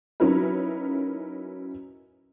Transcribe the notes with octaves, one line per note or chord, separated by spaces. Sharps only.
F#3 C#4 D#4 E4 A#4 B4